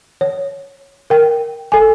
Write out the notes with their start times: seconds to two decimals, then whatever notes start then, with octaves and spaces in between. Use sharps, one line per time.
0.21 C#5
1.10 A#4 G5
1.72 A4 G#5